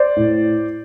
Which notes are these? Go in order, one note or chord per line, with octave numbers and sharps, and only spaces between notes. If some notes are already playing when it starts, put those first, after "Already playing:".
Already playing: C5 D5
A2